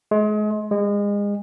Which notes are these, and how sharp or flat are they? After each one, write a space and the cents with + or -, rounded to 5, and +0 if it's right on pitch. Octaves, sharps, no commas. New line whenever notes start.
G#3 +35
G#3 -30